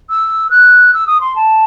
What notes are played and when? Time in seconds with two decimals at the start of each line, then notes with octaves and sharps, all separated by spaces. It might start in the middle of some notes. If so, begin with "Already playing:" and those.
0.09 E6
0.50 F#6
0.94 E6
1.07 D#6
1.20 C6
1.35 A5